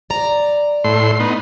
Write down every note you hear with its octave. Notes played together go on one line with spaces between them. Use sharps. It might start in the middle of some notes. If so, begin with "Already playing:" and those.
D5 A#5
A2 C6
B3 D#4